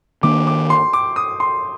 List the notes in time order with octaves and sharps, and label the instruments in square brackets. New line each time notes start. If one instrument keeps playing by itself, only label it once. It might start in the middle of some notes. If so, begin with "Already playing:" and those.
[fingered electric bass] D#3 A#3 D4 [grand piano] D6
[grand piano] D6
C6
D6
D#6
C6